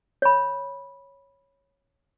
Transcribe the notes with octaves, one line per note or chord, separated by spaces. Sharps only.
C#5 B5